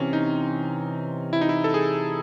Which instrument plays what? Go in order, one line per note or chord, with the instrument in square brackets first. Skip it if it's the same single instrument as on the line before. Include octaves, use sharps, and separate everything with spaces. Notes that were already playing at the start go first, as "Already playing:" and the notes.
Already playing: [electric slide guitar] C3 E3 C4 [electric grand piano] C#4
[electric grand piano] D#4
E4
D#4
E4
A4
G#4